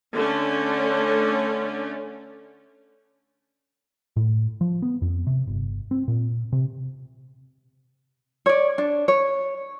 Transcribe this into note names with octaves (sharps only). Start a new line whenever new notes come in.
D3 A3 C#4
A2
F3
B3
F2
C3
G1
C4
A#2
C3
C#5 D5
D4
C#5